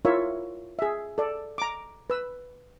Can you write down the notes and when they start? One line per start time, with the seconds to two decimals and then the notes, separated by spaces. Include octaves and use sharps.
0.05 E4 F4 A#4 C#5 E5
0.79 G#4 E5
1.18 A4 D5
1.58 A#5 D6
2.10 B4 E6